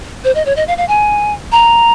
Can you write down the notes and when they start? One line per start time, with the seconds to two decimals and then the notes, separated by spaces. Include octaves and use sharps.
0.24 C5
0.35 D#5
0.46 C#5
0.56 D#5
0.68 F5
0.78 F5
0.88 G#5
1.52 A#5